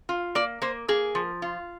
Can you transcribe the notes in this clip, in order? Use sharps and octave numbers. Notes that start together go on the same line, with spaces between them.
F4
A#3 D5
A#3 C5
A#3 G#4
F3
F4